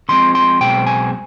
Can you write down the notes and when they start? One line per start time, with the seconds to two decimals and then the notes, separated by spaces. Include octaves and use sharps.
0.09 C#3 F3 G#3 C4 C6
0.35 C6
0.61 B1 B2 G#3 C4 G5
0.87 G#5